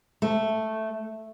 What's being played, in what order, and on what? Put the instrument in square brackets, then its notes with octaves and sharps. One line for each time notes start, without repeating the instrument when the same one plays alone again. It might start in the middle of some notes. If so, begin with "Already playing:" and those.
[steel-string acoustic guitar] A3